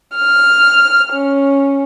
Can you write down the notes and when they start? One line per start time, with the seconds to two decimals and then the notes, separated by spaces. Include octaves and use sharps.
0.17 F6
1.13 C#4